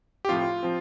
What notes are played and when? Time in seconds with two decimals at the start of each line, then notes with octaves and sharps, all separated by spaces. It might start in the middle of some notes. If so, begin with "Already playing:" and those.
0.25 G4
0.29 A2 F3 C4 F4
0.63 F3 C4